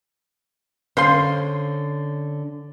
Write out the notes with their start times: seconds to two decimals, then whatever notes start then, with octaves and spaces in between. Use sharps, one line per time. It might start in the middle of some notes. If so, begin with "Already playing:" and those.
0.97 D3 C#4 C5 F5 C6